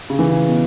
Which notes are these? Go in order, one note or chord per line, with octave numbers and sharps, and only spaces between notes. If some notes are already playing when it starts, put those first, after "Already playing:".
C#3
E3
C#3
B2